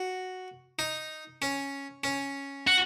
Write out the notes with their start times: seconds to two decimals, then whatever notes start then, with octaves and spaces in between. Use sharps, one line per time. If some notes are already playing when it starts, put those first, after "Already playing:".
Already playing: F#4
0.79 D#4
1.42 C#4
2.04 C#4
2.67 F#4